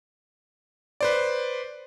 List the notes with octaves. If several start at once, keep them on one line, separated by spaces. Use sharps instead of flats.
B4 C5 D5